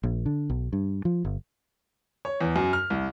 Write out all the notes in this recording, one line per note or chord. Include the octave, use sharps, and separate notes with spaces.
A#1
D3
B1
G2
F3
G1
C#5
E2
F#2
F6
C2